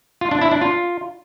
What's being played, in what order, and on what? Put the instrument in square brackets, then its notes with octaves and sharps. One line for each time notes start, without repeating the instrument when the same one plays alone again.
[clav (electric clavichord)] F4
D4
E4
D4
F4